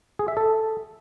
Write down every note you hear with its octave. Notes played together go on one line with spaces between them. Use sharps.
G#4
E5
A4